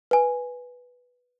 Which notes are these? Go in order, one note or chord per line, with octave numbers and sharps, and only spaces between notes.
B4 G#5